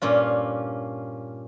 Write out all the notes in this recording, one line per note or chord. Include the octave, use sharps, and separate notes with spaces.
G2 A#2 C#4 F4